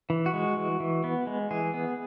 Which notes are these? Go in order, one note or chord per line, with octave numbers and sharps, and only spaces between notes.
E3
F#4
G#3
E3
E3
B3
G#3
E3 G#4
B3